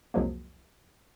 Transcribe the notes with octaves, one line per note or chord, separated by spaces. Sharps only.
C2 F2 F3 F#3 G#3 A#3